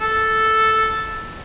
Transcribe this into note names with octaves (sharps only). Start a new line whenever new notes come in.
A4